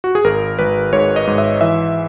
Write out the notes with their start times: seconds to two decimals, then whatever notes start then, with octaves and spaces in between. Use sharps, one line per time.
0.04 F#4
0.15 G#4
0.24 G#1 A#4
0.59 G#1 B4
0.93 G#2 C#5
1.16 D#5
1.27 G#2
1.38 E5
1.61 E3 E5